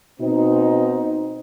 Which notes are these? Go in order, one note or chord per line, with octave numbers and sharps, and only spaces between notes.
B2 C4 D#4